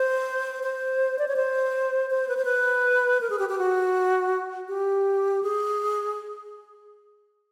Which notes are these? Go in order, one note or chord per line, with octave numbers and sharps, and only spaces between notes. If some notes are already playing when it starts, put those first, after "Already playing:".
Already playing: C5
C5
D5
C#5
C5
C5
B4
C5
B4
A#4
G#4
G4
G4
F#4
G4
G#4